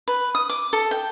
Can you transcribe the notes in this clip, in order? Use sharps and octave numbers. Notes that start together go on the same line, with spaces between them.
B4
D#6
D6
A4
G5